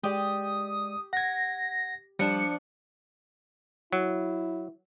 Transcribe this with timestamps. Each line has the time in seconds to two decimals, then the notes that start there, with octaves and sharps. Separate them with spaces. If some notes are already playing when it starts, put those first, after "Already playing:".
0.03 G#3 G4 D5 D#6
1.13 F#5 G#6 A#6
2.19 F3 G3 D4 C#7
3.92 F#3 E4